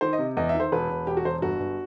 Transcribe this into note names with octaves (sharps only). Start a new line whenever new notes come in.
D#3 C5
D#5
C3
E2 D#5
E5
D#3
C5
E1 B4
E1
E1 G4
F#4
E1 C5
G1 F#4
G1